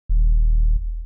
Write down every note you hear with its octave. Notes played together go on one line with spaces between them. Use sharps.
D#1